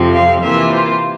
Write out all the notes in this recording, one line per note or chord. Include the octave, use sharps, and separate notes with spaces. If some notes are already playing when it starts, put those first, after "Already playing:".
Already playing: F2 C3 F3 C4
F5
C3 E3 A#3 F4 E5
C5